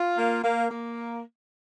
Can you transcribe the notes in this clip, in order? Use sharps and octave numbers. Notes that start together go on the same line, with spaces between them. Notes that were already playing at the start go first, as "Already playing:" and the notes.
Already playing: F4
A#3
A#3
A#3